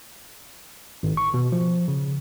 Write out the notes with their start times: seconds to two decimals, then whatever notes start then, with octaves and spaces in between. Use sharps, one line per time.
1.03 G#1
1.17 C#6
1.34 B2
1.52 F3
1.88 C#3